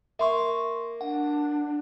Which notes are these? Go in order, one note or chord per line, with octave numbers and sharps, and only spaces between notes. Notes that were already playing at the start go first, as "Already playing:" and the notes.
A#3 E5 C6 C#6
D4 F#5